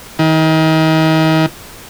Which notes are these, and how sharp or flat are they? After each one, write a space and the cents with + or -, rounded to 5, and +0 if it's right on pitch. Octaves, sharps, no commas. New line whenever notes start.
D#3 +35